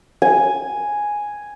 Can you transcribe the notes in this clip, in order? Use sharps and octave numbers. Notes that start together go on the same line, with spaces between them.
G#5